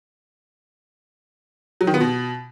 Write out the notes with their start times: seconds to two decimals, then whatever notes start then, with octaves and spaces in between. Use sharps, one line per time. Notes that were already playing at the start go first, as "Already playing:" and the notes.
1.81 F#3
1.87 D#3
1.94 B3
2.01 B2